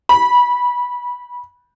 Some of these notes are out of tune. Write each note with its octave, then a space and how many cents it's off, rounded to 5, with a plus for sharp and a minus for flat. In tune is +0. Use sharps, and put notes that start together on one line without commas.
B5 -20